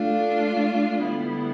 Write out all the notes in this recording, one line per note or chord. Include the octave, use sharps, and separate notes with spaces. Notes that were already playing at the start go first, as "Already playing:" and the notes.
Already playing: A3 D4 F4
D3 G3 B3 E4